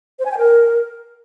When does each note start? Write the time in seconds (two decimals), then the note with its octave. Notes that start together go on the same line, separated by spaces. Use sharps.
0.19 C5
0.25 G#5
0.32 G5
0.38 A#4